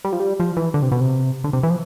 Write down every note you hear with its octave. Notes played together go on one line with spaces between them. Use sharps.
G3
F3
G3
F3
E3
D3
C3
B2
C3
D3
C3
E3
F3